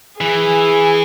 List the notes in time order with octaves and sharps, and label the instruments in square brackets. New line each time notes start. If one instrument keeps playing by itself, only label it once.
[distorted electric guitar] E3 [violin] G#4